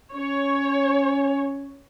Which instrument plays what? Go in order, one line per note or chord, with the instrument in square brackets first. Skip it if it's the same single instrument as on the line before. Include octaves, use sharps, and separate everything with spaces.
[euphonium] C#4 [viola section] C#5